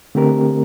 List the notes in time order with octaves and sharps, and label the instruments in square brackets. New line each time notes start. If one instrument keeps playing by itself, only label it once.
[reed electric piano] D3 A3 C4 G4 A#4